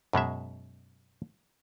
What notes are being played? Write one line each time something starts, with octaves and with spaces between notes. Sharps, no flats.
F#2 B2 G#3 E5